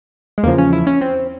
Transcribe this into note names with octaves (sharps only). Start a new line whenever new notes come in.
G#3
E2 C#3 F3 A#3
C#4
E4
C#4
C4